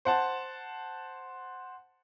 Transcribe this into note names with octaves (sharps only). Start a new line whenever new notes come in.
C5 F#5 A5